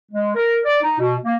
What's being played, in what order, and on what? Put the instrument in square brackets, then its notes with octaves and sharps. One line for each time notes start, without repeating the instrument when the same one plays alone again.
[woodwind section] G#3
A#4
D5
D#4
B2
A#3